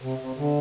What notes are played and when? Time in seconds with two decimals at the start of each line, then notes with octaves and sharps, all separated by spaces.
0.02 C3
0.19 C3
0.37 D3